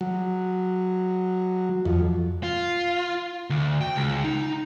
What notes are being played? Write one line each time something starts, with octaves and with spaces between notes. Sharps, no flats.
F#3
F2
F4
D2
G5
C#2
D#4